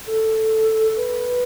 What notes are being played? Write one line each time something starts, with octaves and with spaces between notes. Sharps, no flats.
A4
B4